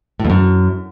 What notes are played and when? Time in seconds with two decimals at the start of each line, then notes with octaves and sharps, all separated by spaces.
0.20 A2
0.25 F2
0.30 F#2